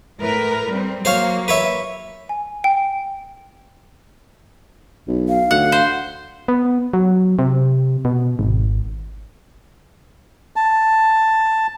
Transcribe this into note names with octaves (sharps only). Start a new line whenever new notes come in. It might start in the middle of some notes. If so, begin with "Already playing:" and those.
A2 A#4 B4
G3 C4
F#3 A#3 C5 C#5 F5
B4 C#5 E5
G#5
G5
B1
F5
D2 F#5
C5
B3
F#3
C3
B2
G#1
A5